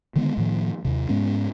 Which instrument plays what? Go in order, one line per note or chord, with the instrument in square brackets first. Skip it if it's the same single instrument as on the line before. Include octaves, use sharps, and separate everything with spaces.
[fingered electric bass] D3 D#3 G#3 B3
A2 D#3 F3 A#3
D#2 C3
G#2 G#3 B3 C#4